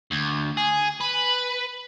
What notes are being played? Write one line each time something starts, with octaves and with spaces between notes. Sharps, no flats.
D2
G#4
B4